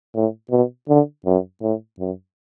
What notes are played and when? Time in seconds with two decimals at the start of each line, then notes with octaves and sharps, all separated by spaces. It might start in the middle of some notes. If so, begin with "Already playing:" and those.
0.15 A2
0.51 B2
0.89 D3
1.26 F#2
1.62 A2
2.00 F#2